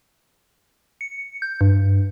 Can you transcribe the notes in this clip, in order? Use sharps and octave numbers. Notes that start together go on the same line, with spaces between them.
C#7
G6
G2